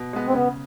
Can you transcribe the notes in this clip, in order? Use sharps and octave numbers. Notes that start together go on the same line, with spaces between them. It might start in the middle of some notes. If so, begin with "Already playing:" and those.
Already playing: B2
G#3 B3
C4
C#3 B3